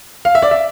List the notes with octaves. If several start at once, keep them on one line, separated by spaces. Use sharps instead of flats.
F5
E5
D5
E5